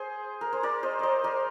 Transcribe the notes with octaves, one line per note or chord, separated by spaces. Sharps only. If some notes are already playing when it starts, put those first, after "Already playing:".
Already playing: G#4 C5
A#4
C5
A#4 D5
C5 D#5
C5 D5 D#5
A#4 D5